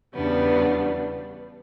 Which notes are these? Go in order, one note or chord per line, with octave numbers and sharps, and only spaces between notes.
E2 C#3 G3 B3 D4